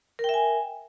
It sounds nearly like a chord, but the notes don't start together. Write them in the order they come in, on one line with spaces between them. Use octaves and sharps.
A#4 G5 E5 G#5